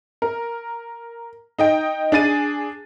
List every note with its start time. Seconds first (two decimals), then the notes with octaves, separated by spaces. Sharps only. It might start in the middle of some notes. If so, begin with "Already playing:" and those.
0.22 A#4
1.59 D#4 D#5 G5
2.12 D4 G#4 A6 D#7